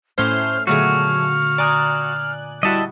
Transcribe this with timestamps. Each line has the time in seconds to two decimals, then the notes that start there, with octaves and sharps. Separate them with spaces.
0.18 A2 A3 C#4 C5 F6
0.67 A#2 D3 F#3 A3 B3 F#4 G#4 F6
1.58 D5 G#5 A#5 D#6 F#6
2.63 G3 E4 F#4 D#5 A5